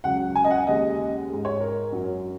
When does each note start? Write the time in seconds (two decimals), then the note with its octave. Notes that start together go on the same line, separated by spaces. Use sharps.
0.04 C#2 C#3 F#3 F#5
0.36 G#5
0.44 D#5
0.51 F#5
0.67 D#2 C#3 G#3 D#5
1.30 G#2 G#3
1.45 C#5
1.60 A#4
1.92 F#2 F#3